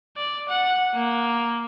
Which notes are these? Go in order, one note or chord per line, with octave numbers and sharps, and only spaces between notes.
D5
F#5
A#3